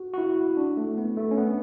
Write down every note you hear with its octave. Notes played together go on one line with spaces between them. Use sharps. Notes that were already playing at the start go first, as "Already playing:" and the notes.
Already playing: F#4
F#4
E4
D4
A3
B3
A3
C#4
B3